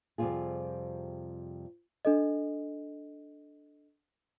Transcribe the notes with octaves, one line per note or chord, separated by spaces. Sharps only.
F2 C3 G3 C4 F4 G#4
D4 A4 D#5